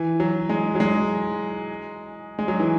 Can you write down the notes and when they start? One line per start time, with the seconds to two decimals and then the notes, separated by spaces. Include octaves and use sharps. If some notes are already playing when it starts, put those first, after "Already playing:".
Already playing: E3
0.20 F#3
0.49 G#3
0.75 F#3
0.80 G#3
2.39 G#3
2.48 F#3
2.60 E3